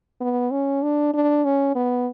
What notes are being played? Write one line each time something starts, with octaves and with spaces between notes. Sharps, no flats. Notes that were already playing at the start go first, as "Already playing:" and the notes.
B3
C#4
D4
D4
C#4
B3